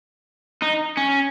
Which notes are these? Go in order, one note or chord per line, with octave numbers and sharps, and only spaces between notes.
D#4
C#4